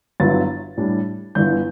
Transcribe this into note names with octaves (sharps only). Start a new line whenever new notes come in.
G1 G2 F#3 B3 E4 A6
A2 G3 D4
G1 G2 E3 B3 E4 G6